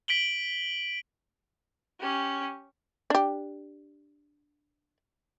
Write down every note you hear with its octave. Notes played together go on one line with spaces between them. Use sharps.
B6 D7 F#7 G7
C#4 G4
D4 G4